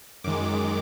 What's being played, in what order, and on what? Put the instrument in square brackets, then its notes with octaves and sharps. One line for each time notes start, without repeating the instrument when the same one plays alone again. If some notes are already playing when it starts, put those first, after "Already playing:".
[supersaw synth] F#2 D#3 G#3 D6